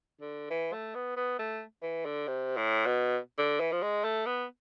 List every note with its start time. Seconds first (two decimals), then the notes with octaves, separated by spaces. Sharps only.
0.21 D3
0.50 E3
0.73 A3
0.95 B3
1.17 B3
1.39 A3
1.83 E3
2.05 D3
2.28 C3
2.57 A2
2.86 B2
3.38 D3
3.60 E3
3.72 F3
3.82 G#3
4.04 A3
4.26 B3